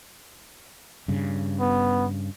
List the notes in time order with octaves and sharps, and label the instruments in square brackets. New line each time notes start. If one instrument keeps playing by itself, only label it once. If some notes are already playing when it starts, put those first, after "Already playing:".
[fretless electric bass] G2 C#3
[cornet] B3